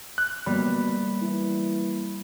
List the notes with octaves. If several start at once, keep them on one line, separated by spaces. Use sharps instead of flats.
F#6
B2 G3 A#3 B5
E3